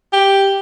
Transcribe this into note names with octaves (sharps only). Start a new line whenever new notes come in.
G4